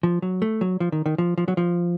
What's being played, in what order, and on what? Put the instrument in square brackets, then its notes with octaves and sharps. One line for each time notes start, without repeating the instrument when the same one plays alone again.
[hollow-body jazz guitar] F3
F#3
A3
F#3
F3
D#3
D#3
F3
F3
F#3
F3